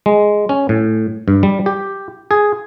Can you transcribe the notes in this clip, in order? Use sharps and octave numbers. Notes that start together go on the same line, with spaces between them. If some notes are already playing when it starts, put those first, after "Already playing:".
G#3
C#4
A2
G2
G3
G4
G#4